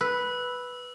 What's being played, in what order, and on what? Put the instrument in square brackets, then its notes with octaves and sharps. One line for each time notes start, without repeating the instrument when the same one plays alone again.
[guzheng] B4 [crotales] E6